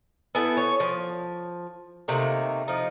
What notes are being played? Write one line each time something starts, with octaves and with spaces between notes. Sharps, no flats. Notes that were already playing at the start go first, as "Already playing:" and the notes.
B3 E4 A4 G#5
C#5
F3
C3 D#3 A3 A#3
F3 D#4